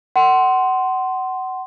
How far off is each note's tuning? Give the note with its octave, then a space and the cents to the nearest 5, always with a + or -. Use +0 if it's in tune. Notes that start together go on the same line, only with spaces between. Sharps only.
F#5 +25 C6 +0